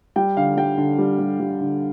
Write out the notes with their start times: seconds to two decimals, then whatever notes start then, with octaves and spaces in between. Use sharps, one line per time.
0.16 G3 G5
0.37 D3 F5
0.57 G3 G5
0.77 D3
0.98 G3
1.19 G3
1.40 G3
1.61 D3